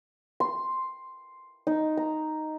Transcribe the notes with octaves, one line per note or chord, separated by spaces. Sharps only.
C6
D#4
A#5